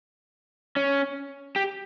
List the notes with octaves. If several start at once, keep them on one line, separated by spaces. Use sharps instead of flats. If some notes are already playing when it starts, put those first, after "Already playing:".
C#4
G4